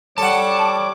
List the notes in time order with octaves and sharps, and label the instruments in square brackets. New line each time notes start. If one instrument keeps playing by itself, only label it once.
[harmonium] G3 C#5 [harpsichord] A4 F#5 [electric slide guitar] A5 [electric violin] D6